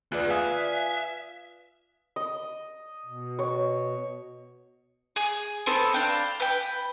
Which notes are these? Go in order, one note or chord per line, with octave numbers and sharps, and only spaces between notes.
D2 B3 F4 G#4 B4 D5 F#6
E5 F5 G#5 D#6
D#5
B2
C#5
G#4
B3 C4 A4
D4 F5 G5
B4 G5